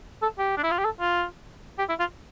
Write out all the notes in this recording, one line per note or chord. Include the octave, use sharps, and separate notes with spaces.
A4
G4
D4
E4
F4
G4
A4
F4
G4
E4
F4